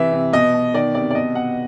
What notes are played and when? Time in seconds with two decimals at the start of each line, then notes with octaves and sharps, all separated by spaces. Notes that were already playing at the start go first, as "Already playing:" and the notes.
Already playing: C3 E3 E5
0.12 C3
0.33 B2 D#5
0.54 B2
0.74 D#3 D5
0.95 C3 D5
1.11 D5
1.15 B2 D#5
1.35 B2 F#5